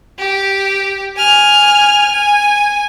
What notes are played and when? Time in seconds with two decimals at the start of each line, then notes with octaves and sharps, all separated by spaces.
0.19 G4
1.17 G#5 F6
2.12 G#5